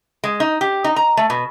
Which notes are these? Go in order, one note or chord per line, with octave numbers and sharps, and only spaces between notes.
G#3
D#4
G4
D#4
A#5
A3
B2